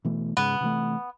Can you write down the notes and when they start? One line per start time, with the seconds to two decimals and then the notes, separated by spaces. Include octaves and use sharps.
0.05 B2 E3 A3
0.37 G#2 C#3 G#3 B3
0.61 C3 E3 A3